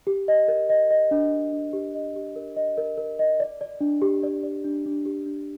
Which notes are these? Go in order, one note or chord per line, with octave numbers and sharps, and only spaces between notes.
G4
D#5
A#4
D#5
D#5
D4
D#5
D4
G4
D#5
G4
A#4
D#5
A#4
A#4
D#5
D5
D5
D4
G4
D5
D5
D4
D4
G4
D4